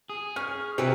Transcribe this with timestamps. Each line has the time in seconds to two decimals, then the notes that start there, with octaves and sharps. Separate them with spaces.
0.09 G#4
0.36 C#4 F6
0.78 C3 E3 C4 E4 B4